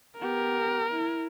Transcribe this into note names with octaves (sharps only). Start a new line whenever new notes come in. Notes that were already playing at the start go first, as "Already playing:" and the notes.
B3 G4 A#4
E4